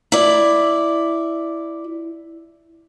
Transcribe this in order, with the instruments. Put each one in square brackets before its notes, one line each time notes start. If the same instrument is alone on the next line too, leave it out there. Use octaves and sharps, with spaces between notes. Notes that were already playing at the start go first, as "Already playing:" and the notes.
[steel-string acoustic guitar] E4 D5